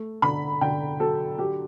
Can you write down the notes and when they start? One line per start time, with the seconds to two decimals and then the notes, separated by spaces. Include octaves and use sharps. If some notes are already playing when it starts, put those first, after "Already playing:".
Already playing: A3
0.22 D3 B5
0.61 D3 G5
1.00 F#3 A4
1.38 F#3 G4